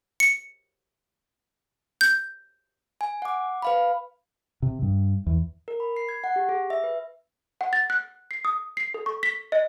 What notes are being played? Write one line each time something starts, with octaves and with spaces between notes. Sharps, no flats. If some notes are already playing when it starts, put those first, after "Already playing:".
C#7
G6
G#5
F#5 D6
B4 F5 B5
C3
G2
E2
A#4
B5
C7
G#6
F#5
G4
G#4
E5
B4
F#5
A6
F#6
C7
D#6
C7
A4
C#6
B6
D#5